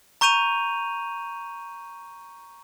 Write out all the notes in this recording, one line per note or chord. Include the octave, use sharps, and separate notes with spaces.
A#5 C#6 G6 D#7 F7